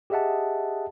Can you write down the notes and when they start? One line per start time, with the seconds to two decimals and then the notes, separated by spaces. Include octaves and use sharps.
0.10 G4 G#4 D#5 E5 F#5 A5